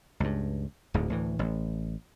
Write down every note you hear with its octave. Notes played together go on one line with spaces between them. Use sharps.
C#2 G2
D1 D2 G#2 D3
D2 A2 E3
A1